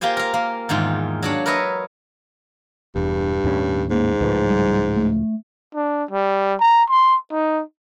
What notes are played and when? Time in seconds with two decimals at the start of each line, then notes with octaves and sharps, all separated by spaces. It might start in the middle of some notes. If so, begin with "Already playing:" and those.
0.01 A#3 F4 G4 C5 G#5
0.17 A#4 F5
0.34 A#3
0.69 E2 G#2 D#3 F4
1.23 F#3 D4 C#5
1.46 A#4 B4 C#5 D#5 E5
2.96 E1 E2 G2
3.44 D#2 A2 C#4
3.91 G#2 A#3
4.21 C#2 A2 F3 B4
4.46 G3
4.96 A3
5.75 D4
6.11 G3
6.60 A#5
6.89 C6
7.32 D#4